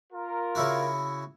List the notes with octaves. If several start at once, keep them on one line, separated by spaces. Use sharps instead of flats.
F4 A#4
C#3 E4 F#4